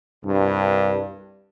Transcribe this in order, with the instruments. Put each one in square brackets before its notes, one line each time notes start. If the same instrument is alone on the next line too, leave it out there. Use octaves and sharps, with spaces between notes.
[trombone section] C2 G2